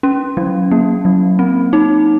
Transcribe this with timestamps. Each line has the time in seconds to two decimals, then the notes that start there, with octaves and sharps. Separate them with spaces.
0.03 C#4
0.37 F#3
0.71 A#3
1.05 F#3
1.39 C4
1.73 D#4